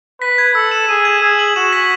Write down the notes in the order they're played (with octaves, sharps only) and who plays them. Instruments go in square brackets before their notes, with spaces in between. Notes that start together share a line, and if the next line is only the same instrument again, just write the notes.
[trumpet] B4 [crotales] B6
[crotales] G#6
[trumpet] A4 [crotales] E6
[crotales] E7
[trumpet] G#4 [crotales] D#7
[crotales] G#6
[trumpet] G#4 [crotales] E6
[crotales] F#7
[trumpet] F#4 [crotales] E7
[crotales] B6